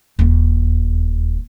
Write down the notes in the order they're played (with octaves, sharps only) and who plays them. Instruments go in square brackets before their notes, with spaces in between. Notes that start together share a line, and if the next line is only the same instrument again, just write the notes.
[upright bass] D#1 E2